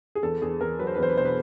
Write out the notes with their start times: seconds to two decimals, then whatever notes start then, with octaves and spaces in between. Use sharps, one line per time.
0.15 G#4
0.23 E2 A4
0.41 E2 G#4
0.60 E2 A#4
0.79 F#3 B4
0.87 C5
0.95 B4
0.98 E2 C5
1.09 B4
1.17 B2 C5
1.25 B4